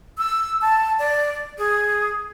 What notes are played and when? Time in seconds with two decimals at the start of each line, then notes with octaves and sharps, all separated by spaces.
0.18 E6
0.61 A5
0.99 D5
1.58 G#4